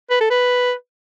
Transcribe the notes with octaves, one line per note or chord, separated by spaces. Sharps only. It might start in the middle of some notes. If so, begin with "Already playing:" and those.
B4
A4
B4